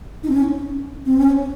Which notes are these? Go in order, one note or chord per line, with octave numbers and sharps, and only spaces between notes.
D#4
C4
C#4
C4
C#4